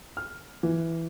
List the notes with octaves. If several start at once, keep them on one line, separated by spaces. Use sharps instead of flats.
F6
E3